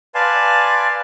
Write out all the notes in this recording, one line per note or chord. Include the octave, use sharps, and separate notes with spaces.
B4 D5 F5 G#5 A5 C6